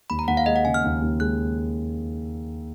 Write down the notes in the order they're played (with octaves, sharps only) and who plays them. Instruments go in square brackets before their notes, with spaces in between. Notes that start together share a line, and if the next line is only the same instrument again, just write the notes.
[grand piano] D#2 [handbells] B5
[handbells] A#5
[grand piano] D#2 [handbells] F#5
[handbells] F5
[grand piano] G#3 [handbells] D#5
[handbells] F#5
[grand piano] C#3 [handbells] G#5
[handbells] F6
[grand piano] D#2
D#2
[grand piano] G#3 [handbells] F#6